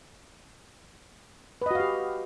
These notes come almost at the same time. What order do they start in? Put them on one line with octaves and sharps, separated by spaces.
B4 D#5 F#4 F5 G4